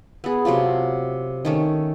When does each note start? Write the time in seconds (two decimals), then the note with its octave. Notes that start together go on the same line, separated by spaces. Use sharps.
0.24 B3 G#4
0.45 C3 F#3 A3 F4
1.45 D#3 A3 C#4